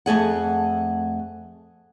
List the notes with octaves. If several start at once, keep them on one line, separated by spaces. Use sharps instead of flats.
F2 A3 G#4 F#5